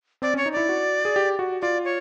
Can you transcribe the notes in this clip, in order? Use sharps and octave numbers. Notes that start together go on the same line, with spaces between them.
C4 D5
C#4
C#5
D#4
E4 D5
F#4
G#4
G4
F#4
F4 D5
C#5